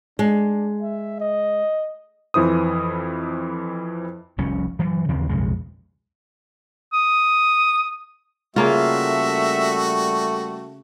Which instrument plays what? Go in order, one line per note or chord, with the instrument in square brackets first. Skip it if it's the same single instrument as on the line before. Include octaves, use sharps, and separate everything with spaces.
[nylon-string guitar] G#3 [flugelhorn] D4
[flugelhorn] E5
D#5
[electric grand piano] F2 E3 E4 C5 D#6
[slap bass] F1 C2 F2 C#4
G2 E3 F#3
D#2 C#3 E3 C4
B1 F2 C#3 G#3
[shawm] D#6
[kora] C#3 A#3 F4 [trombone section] G3 A3 [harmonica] F#4 [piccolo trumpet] E5